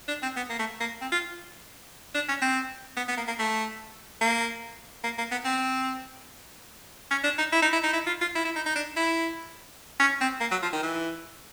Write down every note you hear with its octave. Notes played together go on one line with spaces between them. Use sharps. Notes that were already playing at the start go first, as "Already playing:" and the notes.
D4
C4
B3
A#3
A3
A#3
C4
F4
D4
C#4
C4
B3
B3
A#3
A#3
A3
A#3
A#3
A#3
B3
C4
C#4
D4
D#4
E4
D#4
E4
D#4
E4
F4
F4
E4
E4
D#4
D#4
D4
E4
C#4
C4
A#3
F#3
F3
D#3
E3